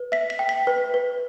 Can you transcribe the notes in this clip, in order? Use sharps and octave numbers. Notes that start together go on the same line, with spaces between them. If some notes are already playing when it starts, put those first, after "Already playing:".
Already playing: B4
E5 B6
B6
G5
B6
B4
B4